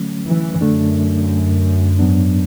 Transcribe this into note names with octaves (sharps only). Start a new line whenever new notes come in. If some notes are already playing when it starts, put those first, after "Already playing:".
Already playing: D3 F#3 A3 C#4
E3
F#2 D3 A3 D4
G#2 F#3 B3 D4